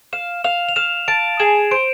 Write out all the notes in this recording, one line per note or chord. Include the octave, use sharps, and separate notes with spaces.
F5 E7
F5 F7
F7
F5 E7
A5 D7
G#4 E7
C5 D7